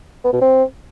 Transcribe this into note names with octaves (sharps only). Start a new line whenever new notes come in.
B3
B2
C4